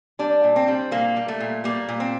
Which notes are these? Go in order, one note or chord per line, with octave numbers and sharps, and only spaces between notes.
G3 D4
A#2
C4
G3
A#2 A#3
G3
A3
A#2
G3 A#3
A#2
C4